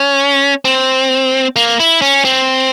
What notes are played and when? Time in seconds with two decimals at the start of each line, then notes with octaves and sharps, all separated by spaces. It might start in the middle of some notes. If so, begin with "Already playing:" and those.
Already playing: C#4
0.65 C4
1.56 A#3
1.80 E4
2.02 C#4
2.25 C4